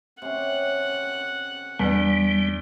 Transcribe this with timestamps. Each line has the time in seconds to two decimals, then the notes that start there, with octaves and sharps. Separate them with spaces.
0.22 C3 C#4 F#5
1.79 E2 G3 D4